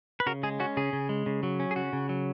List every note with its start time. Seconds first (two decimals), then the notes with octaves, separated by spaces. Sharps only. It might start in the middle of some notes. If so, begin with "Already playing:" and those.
0.20 B4
0.26 C#3 F#4 A#4
0.43 G#3 G#4
0.60 C#4 F#4
0.77 C#3 G#4
0.93 C#3
1.09 G#3
1.26 C#3
1.43 F#3
1.60 C#4
1.71 G#4
1.76 C#3 F#4
1.93 C#3
2.09 F#3